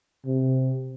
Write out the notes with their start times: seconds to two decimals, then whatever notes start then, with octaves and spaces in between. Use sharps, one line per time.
0.25 C3